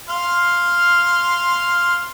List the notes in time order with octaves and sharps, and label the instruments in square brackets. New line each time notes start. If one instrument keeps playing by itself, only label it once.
[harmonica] F5 C6 F6